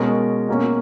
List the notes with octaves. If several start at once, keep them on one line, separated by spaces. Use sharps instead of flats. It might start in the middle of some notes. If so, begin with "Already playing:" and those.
Already playing: B2 G#3 C#4 A#4
B2 A#3 C#4